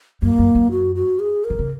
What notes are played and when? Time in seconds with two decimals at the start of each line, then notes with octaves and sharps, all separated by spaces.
0.22 F#2 A#3
0.39 F#2
0.55 F#2
0.71 F#4
0.95 F#4
1.19 G#4
1.44 A#4
1.50 D#3
1.59 C#3